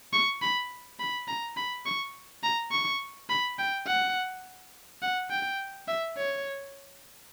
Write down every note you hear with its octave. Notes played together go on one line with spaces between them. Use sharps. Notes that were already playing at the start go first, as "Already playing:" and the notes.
C#6
B5
B5
A#5
B5
C#6
A#5
C#6
B5
G5
F#5
F#5
G5
E5
C#5